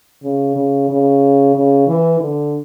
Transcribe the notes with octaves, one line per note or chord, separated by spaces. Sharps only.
C#3
C#3
C#3
C#3
E3
D3